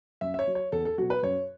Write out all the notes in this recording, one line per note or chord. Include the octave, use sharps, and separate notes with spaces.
F#2 E5
E5
C#5
F#3
C#5
E2 A4
A4
B2 F#3 F#4
B4
F#2 C#5